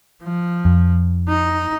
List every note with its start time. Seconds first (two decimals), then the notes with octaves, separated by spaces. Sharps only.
0.23 F3
0.65 F2
1.28 D#4